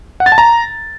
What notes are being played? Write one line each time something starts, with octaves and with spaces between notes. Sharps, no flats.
F#5
A6
A5
A#5